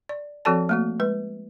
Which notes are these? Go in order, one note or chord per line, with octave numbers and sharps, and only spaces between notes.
D5
F3 C4 F#4 A4 D5 A5
A3 A#3 F#4
G#3 B4